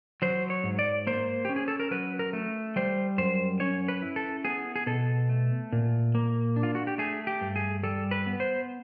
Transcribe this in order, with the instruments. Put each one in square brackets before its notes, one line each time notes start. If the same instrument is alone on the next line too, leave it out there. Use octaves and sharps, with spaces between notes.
[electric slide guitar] F#3 C5
C#5
G#2
D5
A#3 C5
C#4 G4
G#4
A4
A#4
F#3 B4
A#4
A3
G3 C5
F#2 C5
C#4 C#5
B4
E4
A4
B3 G#4
G#4
B2 A4
A3
A#2
A#3
D4
F4
F#4
G4
A3 G#4
G4
G2
G#4
G3 A4
B4
B3
C5